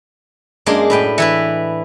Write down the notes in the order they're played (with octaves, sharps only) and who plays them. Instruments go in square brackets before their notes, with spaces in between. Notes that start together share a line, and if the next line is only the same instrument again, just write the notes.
[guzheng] F#2 G#3 A#3 D4 G#4 C6
A2 B4 G5
E3 E4 B4